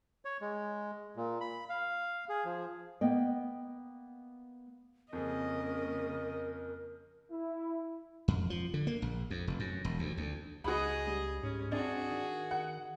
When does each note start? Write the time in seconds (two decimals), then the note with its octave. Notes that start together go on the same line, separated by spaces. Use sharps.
0.25 C#5
0.41 G#3
1.16 A#2
1.41 B5
1.69 F5
2.29 G#4
2.45 F3
3.01 A#3 B3 D#5 G5
5.13 F2 C#3 A#3 G#4 A#4 D#5
7.31 E4
8.28 F2
8.50 F3
8.74 D3
8.87 A#3
9.02 A#1
9.30 F2
9.47 F1
9.60 F#2
9.85 E1
9.99 D2
10.17 D2
10.64 C#2 F#4 G#4 D#5 B5
11.07 G3
11.43 G#2 C#4
11.72 C4 D4 F#4 G#4
12.10 D#3
12.51 D#3 F#5